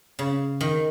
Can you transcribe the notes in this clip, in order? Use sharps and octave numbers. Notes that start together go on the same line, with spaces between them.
C#3
D#3